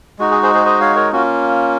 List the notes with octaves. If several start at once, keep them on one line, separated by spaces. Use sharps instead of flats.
G#3 D#4 F#4
G#4
G#4 C5
G#4 C5
C5 D#5
C#5 F5
A#4 C#5
A#3 C#4 F4 F#4